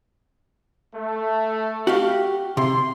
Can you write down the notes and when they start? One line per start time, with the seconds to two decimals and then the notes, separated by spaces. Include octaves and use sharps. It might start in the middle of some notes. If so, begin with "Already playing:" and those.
0.95 A3
1.87 F#4 G4 F5
2.57 C3 C6